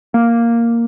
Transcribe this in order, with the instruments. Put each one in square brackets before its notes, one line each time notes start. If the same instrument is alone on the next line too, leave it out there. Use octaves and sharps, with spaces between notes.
[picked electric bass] A#3